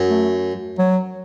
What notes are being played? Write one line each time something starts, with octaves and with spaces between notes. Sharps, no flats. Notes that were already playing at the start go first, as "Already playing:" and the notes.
Already playing: F#2
A3
F#3